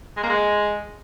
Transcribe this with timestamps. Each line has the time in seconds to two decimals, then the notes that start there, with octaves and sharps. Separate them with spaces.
0.17 G#3
0.23 A#3
0.30 G#3